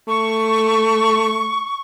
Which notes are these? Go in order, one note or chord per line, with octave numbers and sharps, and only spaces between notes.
A3 C#6